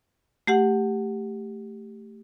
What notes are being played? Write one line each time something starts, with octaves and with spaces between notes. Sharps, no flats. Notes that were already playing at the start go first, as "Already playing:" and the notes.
A3 G4 F#5